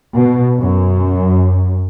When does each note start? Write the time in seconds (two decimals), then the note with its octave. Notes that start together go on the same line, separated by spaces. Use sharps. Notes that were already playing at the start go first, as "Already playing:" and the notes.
0.16 B2
0.58 F#2